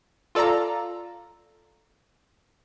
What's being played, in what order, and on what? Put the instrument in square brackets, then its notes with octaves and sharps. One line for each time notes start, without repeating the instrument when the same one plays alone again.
[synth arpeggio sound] F4 A4 D5 F5 A#5